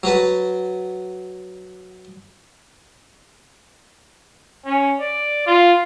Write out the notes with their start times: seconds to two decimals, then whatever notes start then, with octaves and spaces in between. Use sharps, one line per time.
0.03 F#3 F#4 B4 A5
4.65 C#4
5.00 D5
5.47 F4